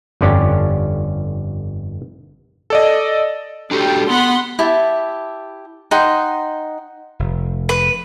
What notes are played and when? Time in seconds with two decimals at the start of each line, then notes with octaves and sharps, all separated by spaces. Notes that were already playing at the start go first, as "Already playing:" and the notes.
0.21 G1 F2 D3 C#4 D4 G4
2.70 A4 D5 D#5
3.71 G3 D4 F#4 G4 A4 G5
4.10 B3 F#5 B5 C6
4.59 E4 G4 E5 A5
5.91 D#4 F#5 G5 C6
7.19 F1
7.69 B4